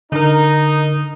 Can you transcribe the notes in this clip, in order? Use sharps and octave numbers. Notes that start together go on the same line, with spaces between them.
D3 D#4 A#4